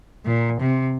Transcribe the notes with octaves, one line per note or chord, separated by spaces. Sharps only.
A#2
C3